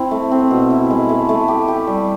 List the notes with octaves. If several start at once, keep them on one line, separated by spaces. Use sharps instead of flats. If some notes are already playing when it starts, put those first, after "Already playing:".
Already playing: C4 E4
A3
C4
B2
E4
G#3
A3
A3
G4
G4
G3